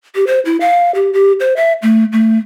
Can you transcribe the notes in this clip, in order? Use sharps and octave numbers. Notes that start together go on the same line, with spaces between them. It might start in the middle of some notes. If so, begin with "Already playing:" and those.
G4
C5
E4
F5
G4
G4
C5
E5
A3
A3